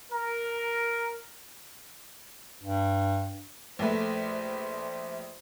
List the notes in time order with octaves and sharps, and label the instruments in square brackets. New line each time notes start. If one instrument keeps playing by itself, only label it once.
[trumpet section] A#4
[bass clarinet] G2
[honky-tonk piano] A#1 A3 B4 [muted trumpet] C5